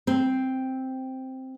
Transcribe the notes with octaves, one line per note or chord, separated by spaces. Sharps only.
C4